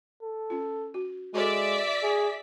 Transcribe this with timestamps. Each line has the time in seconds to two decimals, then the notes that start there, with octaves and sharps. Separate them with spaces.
0.22 A4
0.50 C#4 F4
0.94 F#4
1.34 G#3 F#4 A4 D5 E5 B6
2.03 G#4